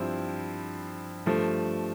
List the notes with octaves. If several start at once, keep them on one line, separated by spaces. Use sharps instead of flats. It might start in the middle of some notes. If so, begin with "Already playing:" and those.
Already playing: G2 F3 C4 E4
G2 F3 A3